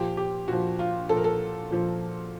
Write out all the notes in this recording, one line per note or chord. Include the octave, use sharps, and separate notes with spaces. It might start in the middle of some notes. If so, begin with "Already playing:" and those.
Already playing: A#2 F3 G4
G4
A#2 F3 F#4
F4
A#2 F3 A4
A#4
A4
A#2 F3